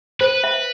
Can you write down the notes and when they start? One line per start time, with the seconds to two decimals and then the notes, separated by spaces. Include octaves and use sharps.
0.20 B4 C5
0.44 E5